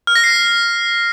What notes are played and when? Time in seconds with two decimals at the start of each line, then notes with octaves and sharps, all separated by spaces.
0.07 F6
0.16 A#6
0.24 C7